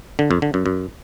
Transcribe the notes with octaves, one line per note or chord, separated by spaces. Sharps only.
D3
F2
D3
F#2
F#2